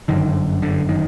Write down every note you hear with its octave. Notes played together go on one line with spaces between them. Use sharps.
G1 F#2 D3 D#3
D3
D#3